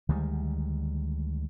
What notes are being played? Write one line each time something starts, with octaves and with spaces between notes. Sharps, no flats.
D2 D#3 G3 G#3